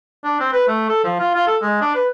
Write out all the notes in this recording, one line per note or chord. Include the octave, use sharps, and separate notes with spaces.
D4
C4
B4
A3
A4
F3
F4
F4
A4
G#3
D4
B4